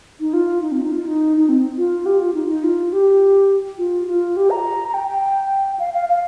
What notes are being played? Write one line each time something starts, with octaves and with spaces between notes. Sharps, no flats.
D#4
F4
D#4
C4
D#4
F4
D#4
D#4
C4
F4
G4
F4
D#4
D#4
F4
G4
F4
F4
G4
A#5
A#5
G5
G5
F5
F5
F5